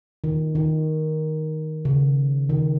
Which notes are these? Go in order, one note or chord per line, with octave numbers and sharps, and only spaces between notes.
D#3
D#3
C#3
D#3